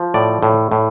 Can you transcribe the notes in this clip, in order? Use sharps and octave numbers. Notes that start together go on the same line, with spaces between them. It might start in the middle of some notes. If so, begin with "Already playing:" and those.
Already playing: F3
A2 D5
A2
A2